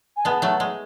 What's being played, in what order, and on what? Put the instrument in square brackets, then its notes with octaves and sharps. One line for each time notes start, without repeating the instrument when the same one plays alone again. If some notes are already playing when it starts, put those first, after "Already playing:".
[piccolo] G#5
[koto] G#3 B3 [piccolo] A5
[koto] F#3 A3
G#3